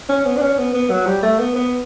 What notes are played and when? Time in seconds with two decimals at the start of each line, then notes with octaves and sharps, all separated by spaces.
0.09 C#4
0.25 B3
0.37 D4
0.41 C#4
0.58 B3
0.74 B3
0.90 F#3
1.06 G3
1.23 A3
1.39 B3
1.56 B3